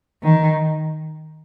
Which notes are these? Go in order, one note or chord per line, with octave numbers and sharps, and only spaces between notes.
D#3